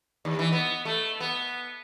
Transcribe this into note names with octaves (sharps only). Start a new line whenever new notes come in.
D#2
E3
B3
A3
B3